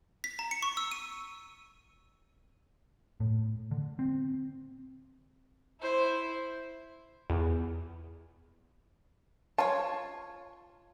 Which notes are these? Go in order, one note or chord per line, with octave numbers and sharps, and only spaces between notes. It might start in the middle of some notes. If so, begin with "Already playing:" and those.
B6
A#5
C#7
C#6
E6
D#7
A2
D3
C4
E4 C5
E2
F4 C#5 A5